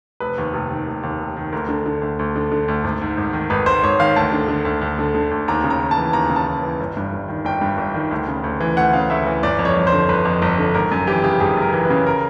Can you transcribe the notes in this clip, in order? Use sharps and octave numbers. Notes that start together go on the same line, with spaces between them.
F1 B4
D#2
F1
D#3
F1
D#2
F1
D#3
D2 A#4
D3
D3
D2
D2
D3
D3
D2
G#1
G#2
G#1
D#3
G#1 B4
G#2 C5
G#1 C#5
D#3 F5
D2 A5
D3
D3
D2
D2
D3
D3
D2
D#2 A#5
C#3
A#5
D#2
A5
E3
D#2 A#5
C#3
A5
D#2
E3
G1
G2
G1
D#3
G1 G5
G2
G1
D#3
D2
C#3
D2
E3
D2 F#5
C#3 F5
D2 E5
E3
G1 D5
F2
C#5
G1
C5
D3
G1 B4
F2
G1
D3
G#1 A#4
F#2
E3 G4
C#3 G4
G#1 G#4
F#2 A#4
E3
B4
C#3
A#4